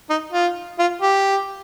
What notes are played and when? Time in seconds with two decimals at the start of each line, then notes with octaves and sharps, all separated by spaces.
0.09 D#4
0.32 F4
0.79 F4
1.02 G4